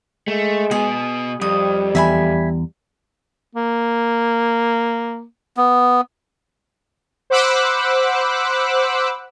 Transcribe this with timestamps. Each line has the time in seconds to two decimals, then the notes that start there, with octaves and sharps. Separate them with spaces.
0.28 G#3 A3
0.71 B2 B3 G#4
1.41 F2 G3 D#6
1.95 E2 E5 G#5 B5
3.55 A#3
5.57 B3
7.30 C5 F#5 B5 D6 E6 F#6